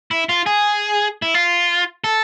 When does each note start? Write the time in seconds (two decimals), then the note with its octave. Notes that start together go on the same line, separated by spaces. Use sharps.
0.11 E4
0.29 F4
0.46 G#4
1.22 E4
1.34 F4
2.04 A4